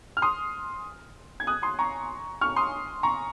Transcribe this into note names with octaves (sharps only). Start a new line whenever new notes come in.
F6
C6 D#6
G#6
D#6 F#6
C6 D#6
A#5 C#6
C#6 F6
C6 D#6
A#5 C#6